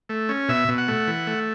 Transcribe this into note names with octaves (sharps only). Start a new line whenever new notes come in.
A3
C#4
B2 E5
B2
F#5
A3
E3
A3